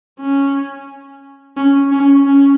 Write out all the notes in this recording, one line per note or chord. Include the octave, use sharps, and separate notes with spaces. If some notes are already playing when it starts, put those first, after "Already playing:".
C#4
C#4
C#4
C#4